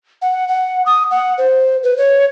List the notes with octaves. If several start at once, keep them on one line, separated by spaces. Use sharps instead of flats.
F#5
F#5
D#6
F#5
C5
B4
C#5